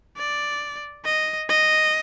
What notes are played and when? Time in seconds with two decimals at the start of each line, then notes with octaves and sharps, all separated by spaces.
0.17 D5
1.05 D#5
1.49 D#5